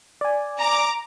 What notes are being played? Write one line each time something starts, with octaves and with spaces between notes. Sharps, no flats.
D5 G#5
A#5 D6